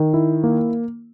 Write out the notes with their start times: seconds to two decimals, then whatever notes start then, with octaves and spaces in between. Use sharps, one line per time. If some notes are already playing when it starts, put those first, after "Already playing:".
Already playing: D#3
0.14 E4
0.44 A#3